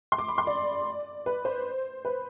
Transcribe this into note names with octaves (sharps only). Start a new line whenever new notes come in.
C6
D6
B5
C6
D5
B4
C5
B4